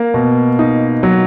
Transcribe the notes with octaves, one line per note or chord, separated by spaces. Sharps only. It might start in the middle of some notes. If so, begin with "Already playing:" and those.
Already playing: A#3
B2
D#4
F#3